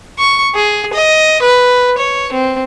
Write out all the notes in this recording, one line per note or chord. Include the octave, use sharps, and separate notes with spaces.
C#6
G#4
D#5
B4
C#5
C4